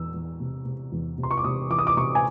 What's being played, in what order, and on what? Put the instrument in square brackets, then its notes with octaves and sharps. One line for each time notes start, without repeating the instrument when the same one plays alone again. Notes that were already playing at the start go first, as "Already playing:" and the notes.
Already playing: [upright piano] E2 E6
E2
C3
C3
E2
C3
C6
C#6
D6
C3 D#6
E3 D6
D#6
D6
C3 C#6
G#5